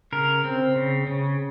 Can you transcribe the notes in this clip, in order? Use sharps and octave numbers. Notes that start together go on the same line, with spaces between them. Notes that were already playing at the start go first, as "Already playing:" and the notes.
C#3 A#4
C4
C#3
C#3